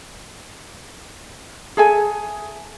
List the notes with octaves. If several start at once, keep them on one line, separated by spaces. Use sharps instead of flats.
G#4 A4 E5 G#5